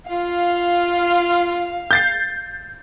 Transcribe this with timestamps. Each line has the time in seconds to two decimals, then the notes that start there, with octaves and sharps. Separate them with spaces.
0.10 F4 F5
1.91 G6 A6 C7